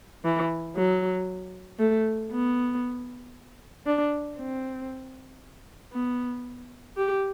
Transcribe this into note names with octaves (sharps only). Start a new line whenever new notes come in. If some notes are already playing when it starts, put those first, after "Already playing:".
E3
F#3
A3
B3
D4
C4
B3
G4